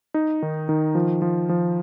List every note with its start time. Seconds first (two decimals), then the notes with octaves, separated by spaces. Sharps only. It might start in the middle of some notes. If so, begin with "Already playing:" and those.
0.14 D#4
0.42 D#3
0.69 D#3
0.95 F3
1.22 F3
1.49 F3